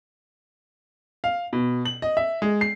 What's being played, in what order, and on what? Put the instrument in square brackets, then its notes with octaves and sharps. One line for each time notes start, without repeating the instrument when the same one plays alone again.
[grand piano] F5
B2
F#7
D#5
E5
G#3
C7